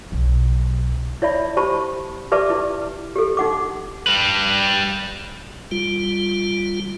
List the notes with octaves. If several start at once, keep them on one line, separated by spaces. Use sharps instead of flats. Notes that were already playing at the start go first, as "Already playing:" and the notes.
B1 F#3
E4 C#5 D5 E5 B5
G4 C5 A5 B5 C#6
G4 B4 D5 E5 A5 D6
E4
G4 A4
D#4 F#5 D6
G3 B4
G3 F4